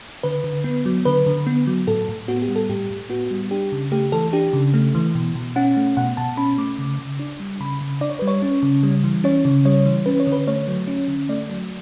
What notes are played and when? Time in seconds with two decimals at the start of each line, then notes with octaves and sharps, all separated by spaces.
0.23 D3 B4
0.44 D3
0.64 B3
0.86 F#3
1.05 D3 B4
1.26 D3
1.47 B3
1.67 F#3
1.87 A2 A4
2.08 A2
2.28 B3 F#4
2.42 G4
2.49 G3
2.56 A4
2.69 A2 G4
2.90 A2
3.10 B3 F#4
3.31 G3
3.51 D4 G4
3.72 C#3
3.92 A3 G4
4.12 E3 A4
4.33 D4 G4
4.53 C#3
4.74 A3
4.95 E3
5.15 B2
5.35 B2
5.56 C#4 F#5
5.77 A3
5.97 B2 F#5
6.17 B2 A5
6.37 C#4 B5
6.58 A3 D6
6.79 C#3
6.99 C#3
7.19 D4
7.40 G3
7.60 C#3 B5
7.81 C#3
8.01 D4 D5
8.10 C#5
8.19 G3 B4
8.28 C#5
8.42 C#4
8.63 C#3
8.83 G3
9.04 E3
9.24 C#4 C#5
9.45 C#3
9.65 G3 C#5
9.86 E3
10.06 C#4 B4
10.20 C#5
10.27 D3
10.32 B4
10.47 A3 C#5
10.67 F#3
10.88 C#4
11.08 D3
11.29 A3 D5
11.50 F#3